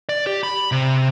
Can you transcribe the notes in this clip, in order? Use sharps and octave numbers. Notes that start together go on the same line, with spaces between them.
D5
G4
B5
C3